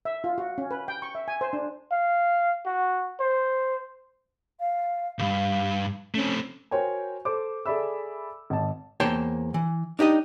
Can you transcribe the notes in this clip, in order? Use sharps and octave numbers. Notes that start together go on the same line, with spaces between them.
E5
F4
F#4
C#4
B4
G5
C#6
E5
G#5
C5
D4
F5
F#4
C5
F5
C2 G2 F5
A3 C4 C#4
F#4 A#4 C5 C#5 G5 G#5
A4 C5 D6
G#4 A4 D5 E5 B5 E6
G#1 A5
E2 A#3 C5 C#5 G5 A5
E3
D4 D#4 G4 D#5